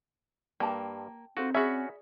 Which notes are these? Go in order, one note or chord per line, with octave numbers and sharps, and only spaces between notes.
G2 A#3 G5 A5
C4 D#4 F4 F#4 A4 C5
C#4 F#4 G#4 D5 E5 B5